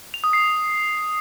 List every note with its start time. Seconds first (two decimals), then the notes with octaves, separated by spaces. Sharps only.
0.14 F7
0.24 D#6
0.33 C7